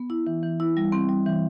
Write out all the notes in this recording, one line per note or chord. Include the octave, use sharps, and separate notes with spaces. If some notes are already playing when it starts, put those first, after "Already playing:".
Already playing: B3
E4
E3
E3
E4
G3
C4
G3
E3